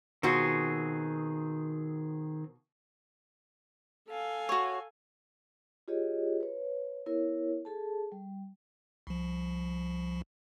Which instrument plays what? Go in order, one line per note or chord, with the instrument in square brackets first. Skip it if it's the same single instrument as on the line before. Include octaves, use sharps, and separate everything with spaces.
[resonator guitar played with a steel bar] B2 F4 F#4 [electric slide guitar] D#3 C4 G#4
[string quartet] A4 F5 G#5
[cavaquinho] F#4 C#5
[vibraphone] F4 G4 G#4 C#5 D#5
B4 C#5
B3 E4 A#4 C#5
G#4 A4 A5
G3
[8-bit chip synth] C2 F3